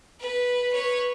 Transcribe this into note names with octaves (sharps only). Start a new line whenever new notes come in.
B4
B4 C#5